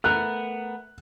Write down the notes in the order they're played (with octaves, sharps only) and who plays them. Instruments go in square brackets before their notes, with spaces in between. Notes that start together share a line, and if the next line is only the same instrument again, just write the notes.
[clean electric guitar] A3 B3 A#4 [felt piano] F#6